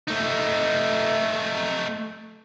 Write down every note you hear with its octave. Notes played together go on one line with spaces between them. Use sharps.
A3 D#4